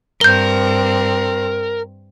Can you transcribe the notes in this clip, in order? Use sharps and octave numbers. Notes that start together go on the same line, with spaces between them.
G2 C4 A#4 G6 G7